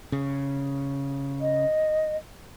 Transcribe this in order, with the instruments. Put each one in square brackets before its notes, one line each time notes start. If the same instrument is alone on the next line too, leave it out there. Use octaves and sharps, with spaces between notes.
[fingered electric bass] C#3
[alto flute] D#5